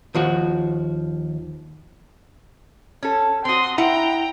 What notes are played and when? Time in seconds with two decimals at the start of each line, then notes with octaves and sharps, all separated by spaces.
0.15 D#2 F3 F#4
3.03 C#4 A4
3.45 C4 F#4 C6 D#6
3.78 E4 F#5 G5 A#5